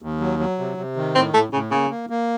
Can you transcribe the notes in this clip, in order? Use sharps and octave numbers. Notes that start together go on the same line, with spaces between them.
D#2
F#3
F#3
C3
C3
D#3
A2 C4
A2 A3
A2 C#3
C#3 A#3
A#3
A#3